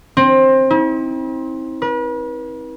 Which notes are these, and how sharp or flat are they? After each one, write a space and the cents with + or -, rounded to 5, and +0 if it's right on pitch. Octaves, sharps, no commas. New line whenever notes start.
C4 +20
E4 -45
B4 -40